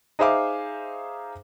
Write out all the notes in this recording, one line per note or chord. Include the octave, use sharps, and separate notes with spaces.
D#4 G#4 C5 E5 F5 D6